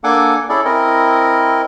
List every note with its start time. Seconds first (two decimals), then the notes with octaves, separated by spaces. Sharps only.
0.04 A#3 D4 A4 F#5 G#5 D6
0.49 C#4 E4 G#4 A4 D5
0.65 C4 E4 A#4 D#5